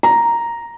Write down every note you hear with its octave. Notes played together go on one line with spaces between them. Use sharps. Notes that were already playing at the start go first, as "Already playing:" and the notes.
A#5